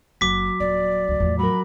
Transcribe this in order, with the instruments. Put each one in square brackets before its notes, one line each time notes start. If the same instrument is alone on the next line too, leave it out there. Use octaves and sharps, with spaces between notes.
[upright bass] F#1 [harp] F#3 [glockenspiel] D6 B6
[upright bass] D#1 [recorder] D5
[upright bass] D2 A#2
[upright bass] E2 A2 [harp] F3
[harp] F#3 A#4 [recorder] B5